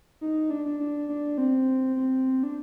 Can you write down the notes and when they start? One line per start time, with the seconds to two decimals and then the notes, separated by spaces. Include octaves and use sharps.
0.21 D#4
0.50 D4
0.65 D4
0.79 D4
1.09 D4
1.38 C4
1.96 C4
2.43 D4